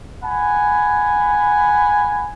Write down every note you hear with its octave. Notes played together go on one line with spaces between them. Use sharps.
F#5 G#5 B5